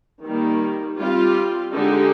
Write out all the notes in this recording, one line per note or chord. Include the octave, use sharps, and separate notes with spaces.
D#3 G3 A#3
G3 C4 F4
D3 G#3 D#4 G4